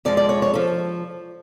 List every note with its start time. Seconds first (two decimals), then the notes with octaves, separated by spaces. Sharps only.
0.05 F2 F3 G#3 D5
0.17 D5
0.29 C#5
0.42 C#5
0.54 F3 A4